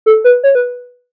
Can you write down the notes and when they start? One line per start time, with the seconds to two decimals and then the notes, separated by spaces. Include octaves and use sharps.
0.06 A4
0.24 B4
0.44 C#5
0.55 B4